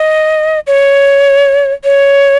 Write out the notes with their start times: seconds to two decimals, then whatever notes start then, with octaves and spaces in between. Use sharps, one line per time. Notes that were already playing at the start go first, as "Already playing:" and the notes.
Already playing: D#5
0.67 C#5
1.84 C#5